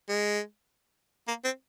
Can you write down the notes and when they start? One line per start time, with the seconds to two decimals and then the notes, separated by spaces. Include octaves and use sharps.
0.09 G#3
1.28 A#3
1.45 C4